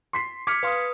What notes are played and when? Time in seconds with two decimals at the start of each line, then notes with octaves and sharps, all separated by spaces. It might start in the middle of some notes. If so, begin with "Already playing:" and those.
0.13 C6 B6 C7
0.47 D6 F6 G#6 B6 C#7
0.63 B4 F5 C6 D#6